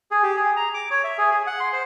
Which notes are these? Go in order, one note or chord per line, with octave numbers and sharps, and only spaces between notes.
G#4
G4
G#4
A#5
D6
C#5
E5
G#4
G#4
F#5
C6
C5